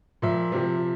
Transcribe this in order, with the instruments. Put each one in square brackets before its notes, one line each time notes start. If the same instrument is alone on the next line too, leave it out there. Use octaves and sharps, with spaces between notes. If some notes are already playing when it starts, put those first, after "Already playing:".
[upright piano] A#2 F3 E5
C3 F3